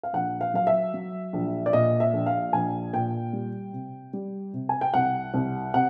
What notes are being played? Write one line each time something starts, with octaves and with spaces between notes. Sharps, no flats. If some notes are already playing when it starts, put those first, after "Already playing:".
F5
A#1 F#5
F5
F#3 F5
E5
F#3
A#1
D5
A#2 D#5
E5
A#1
F5
A#1 G#5
A#2 G5
G3
C3
G3
C3
G#5
G5
C2 F#5
C2
C3 F#5